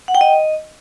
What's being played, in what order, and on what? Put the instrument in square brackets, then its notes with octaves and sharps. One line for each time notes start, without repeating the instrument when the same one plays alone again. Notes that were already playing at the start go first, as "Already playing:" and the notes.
[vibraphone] F#5
G5
D#5